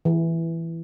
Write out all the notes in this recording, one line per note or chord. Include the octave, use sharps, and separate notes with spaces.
E3